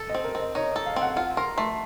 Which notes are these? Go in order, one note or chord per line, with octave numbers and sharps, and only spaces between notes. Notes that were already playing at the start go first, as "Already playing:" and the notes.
Already playing: A4
D#5
C4
A#4
C4
D#5
D#4 C#5
D#5
A4
F5
C4
F#5
F4 F#5
A#4 C6
A3 C6